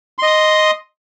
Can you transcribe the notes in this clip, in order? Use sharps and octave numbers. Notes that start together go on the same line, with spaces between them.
D#5 C6 D#6